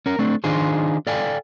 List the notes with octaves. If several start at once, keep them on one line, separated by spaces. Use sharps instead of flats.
C#4 A#4
A3 C4 D4
D#3 D4 D#4 F4 G#4 C5
A4 D5 F5 G5 G#5